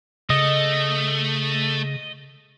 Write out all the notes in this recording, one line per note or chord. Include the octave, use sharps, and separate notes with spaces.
C#3 A3 D#5